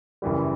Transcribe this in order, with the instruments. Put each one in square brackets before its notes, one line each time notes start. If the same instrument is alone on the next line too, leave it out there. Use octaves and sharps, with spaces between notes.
[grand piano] F#1 F#2 E3 G3